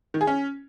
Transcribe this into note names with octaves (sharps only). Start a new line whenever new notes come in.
D#3
G#4
C#4